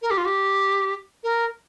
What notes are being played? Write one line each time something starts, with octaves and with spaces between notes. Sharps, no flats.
A#4
G4
F4
G4
A#4